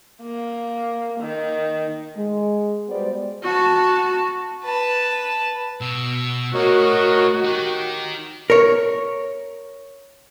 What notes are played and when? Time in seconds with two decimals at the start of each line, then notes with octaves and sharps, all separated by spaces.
0.23 A#3
1.21 D#3
2.16 G#3
2.89 G3 G#3 B3 F#4 C5 D5
3.42 F#4 A5
4.64 B4 A5
5.81 B2 E6
6.54 A2 F#4 A#4 C#5 D#5
7.44 D#4 G4 A#4
8.50 A#4 C#5